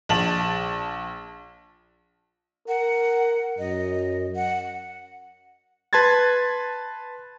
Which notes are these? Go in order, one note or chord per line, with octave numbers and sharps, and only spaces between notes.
A#1 A5 F#7
A#4 F#5
F#2 D#5
F#5
B4 A5 C6 G#6 A6